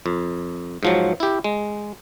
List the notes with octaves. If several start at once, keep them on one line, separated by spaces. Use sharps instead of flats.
F2
G#2 F3 F#3
E4 G4
G#3